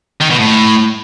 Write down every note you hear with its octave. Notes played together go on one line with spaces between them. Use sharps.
D#3
B2
A2